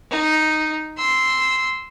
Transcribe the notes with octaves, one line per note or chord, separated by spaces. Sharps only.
D#4
C6 E6